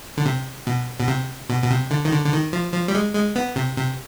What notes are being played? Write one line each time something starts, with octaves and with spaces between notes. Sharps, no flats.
D3
C3
B2
B2
C3
B2
B2
C3
D3
D#3
D3
D3
D#3
F3
F3
G3
G#3
G#3
B3
C3
C3